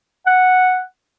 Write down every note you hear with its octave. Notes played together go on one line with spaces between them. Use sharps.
F#5